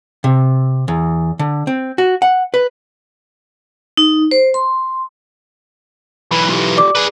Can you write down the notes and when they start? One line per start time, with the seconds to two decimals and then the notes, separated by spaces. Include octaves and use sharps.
0.24 C3
0.88 E2
1.39 D3
1.67 C4
1.98 F#4
2.22 F#5
2.54 B4
3.97 D#4
4.31 C5
4.54 C6
6.31 B1 E3 B5
6.49 F4 G4
6.77 D5 D6
6.95 G#4 B4